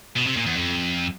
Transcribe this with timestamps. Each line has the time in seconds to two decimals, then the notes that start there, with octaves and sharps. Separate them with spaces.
0.17 B2
0.27 C3
0.37 A#2
0.47 E2
0.57 F2